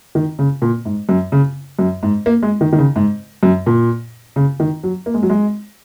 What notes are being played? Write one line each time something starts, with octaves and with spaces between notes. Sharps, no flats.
D#3
C#3
A#2
G#2
F#2
C#3
F#2
G#2
A#3
G#3
D#3
D#3
C#3
G#2
F#2
A#2
C#3
D#3
F#3
A#3
G#3
F#3
G#3